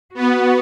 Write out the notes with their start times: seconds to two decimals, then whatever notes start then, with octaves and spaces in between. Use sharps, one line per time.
0.15 B3 F#4